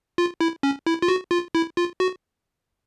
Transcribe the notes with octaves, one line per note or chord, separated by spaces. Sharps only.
F4
E4
C#4
E4
F4
F#4
F4
E4
F4
F#4